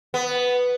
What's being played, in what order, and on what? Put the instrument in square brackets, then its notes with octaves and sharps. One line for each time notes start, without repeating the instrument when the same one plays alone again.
[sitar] B3